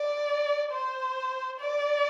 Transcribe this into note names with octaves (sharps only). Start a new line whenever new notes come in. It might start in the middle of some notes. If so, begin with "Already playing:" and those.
Already playing: D5
C5
D5